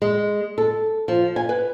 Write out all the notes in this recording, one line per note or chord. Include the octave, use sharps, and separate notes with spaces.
G#3
A4
F3
G#5
B4